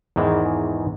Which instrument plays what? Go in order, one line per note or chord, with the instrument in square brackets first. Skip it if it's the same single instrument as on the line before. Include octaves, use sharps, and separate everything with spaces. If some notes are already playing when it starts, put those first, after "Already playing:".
[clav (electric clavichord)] E2 G#2 D#3 E3 G#3